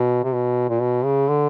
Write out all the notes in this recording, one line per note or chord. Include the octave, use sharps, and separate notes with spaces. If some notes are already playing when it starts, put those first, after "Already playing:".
Already playing: B2
C3
B2
A#2
B2
C#3
D3